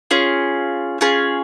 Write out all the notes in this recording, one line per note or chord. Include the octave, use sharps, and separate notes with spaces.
C#4 F4 G#4
C#4 F4 G#4